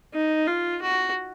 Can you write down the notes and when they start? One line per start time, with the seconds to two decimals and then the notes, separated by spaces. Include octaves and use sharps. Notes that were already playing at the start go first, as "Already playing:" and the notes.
0.14 D#4
0.47 F4
0.82 F#4